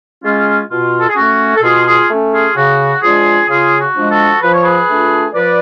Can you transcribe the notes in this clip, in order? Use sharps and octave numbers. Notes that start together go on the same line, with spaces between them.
G#3 C#4 F4
B2 F4
A4
G#4
A3 C#4 F#4
A4
B2 F4 G#4
F4 G#4
A3 C#4
F4 G#4
C#3 F#4
F3 G#3 D4 F4 G#4
C#3 F4 G#4
F#4
F3 G#3 D4
F#4 A4
F3 B4
C#5
G#4 B4
A3 D4 F4
F3 B4 D5